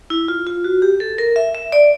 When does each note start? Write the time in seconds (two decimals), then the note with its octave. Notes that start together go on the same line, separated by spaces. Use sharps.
0.10 E4
0.28 F4
0.47 F4
0.64 F#4
0.82 G4
1.00 A4
1.18 A#4
1.36 E5
1.55 E5
1.72 D5